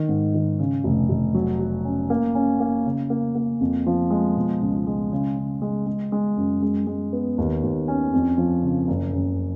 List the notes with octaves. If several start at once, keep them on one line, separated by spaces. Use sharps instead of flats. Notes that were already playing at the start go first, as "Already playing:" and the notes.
Already playing: D#3
G#2
D#3
C#3
F1
F1
F#3
F#4
C#4
A#3
C#4
A#3
C#3
A#3
A#3
F2
F3
G#3
B2
C#2
G#3
C#3
C#3
G#3
G#3
G#3
F#2
G#3
G#3
B3
D#2
D#2
C#4
F2
F3
C#3
F#1
F#1